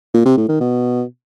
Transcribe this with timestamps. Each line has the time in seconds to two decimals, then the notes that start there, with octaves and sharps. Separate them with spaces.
0.14 A#2
0.26 C3
0.37 A2
0.49 D#3
0.60 B2